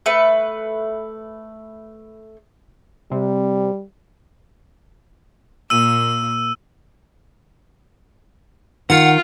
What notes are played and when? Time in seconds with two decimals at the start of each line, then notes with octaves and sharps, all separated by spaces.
0.06 A3 B4
3.11 C3 G3
5.70 A#2 A#3 E6 D#7
8.90 D#3 F4 F#5